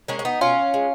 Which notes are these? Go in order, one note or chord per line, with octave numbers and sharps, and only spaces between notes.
G#3 A#3 C#4
C#4
B3 D#4
B2 C#4 F4
G#3